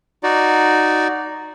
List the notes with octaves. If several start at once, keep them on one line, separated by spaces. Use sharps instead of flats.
D#4 F#4 D5